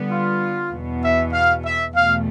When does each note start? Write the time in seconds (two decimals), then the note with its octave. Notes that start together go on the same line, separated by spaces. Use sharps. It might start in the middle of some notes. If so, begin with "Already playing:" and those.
Already playing: D3 G3 B3
0.10 F4
0.72 E2 B2 B3
1.03 E5
1.33 F5
1.64 E5
1.93 E2 B2 A3 F5